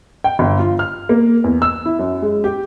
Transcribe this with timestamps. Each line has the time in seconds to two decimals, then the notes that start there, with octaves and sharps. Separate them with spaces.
0.24 G5
0.39 G1
0.59 F4
0.79 F6
1.09 A#3
1.44 E2
1.62 E6
1.85 E4
1.99 F#2
2.22 G#3
2.44 G4